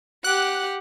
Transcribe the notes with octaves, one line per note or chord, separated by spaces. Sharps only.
G4 F#5 F#6